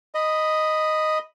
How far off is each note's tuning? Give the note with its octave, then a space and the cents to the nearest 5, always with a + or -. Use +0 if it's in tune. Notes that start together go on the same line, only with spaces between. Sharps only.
D#5 +0 B5 +0